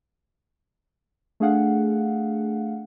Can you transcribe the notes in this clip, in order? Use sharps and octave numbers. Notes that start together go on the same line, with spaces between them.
A3 D4 G#4 F5 F#5